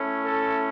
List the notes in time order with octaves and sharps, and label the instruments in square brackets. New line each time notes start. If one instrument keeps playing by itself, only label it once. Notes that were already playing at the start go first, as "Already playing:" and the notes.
Already playing: [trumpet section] A3 C#4 E4
A4